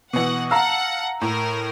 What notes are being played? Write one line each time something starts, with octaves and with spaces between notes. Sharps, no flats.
B2 E3 F#5
F5 F#5 A5 A#5 E6
A2 A#4